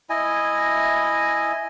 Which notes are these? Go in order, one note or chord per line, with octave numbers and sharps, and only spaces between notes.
E4 D#5 G#5